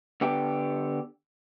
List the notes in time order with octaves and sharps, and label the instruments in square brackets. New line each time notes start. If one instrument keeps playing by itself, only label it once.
[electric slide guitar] D3 B3 G4